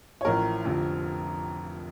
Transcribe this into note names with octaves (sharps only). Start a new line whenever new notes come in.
C#5
A1 A2 F3 A#4
F1 F2 D3 F3